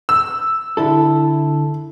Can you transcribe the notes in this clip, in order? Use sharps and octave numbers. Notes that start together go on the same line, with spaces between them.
E6
D3 E4 A4